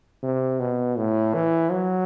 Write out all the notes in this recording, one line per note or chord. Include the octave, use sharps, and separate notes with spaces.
C3
B2
A2
E3
F#3